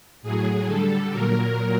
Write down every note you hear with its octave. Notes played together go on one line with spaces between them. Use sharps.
A2 F#3 G#4
D3 G3 A4
A#2 F#3 A#4